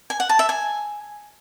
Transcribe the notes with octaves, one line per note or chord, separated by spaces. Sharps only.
G#5
F#5
A5
E5
G#5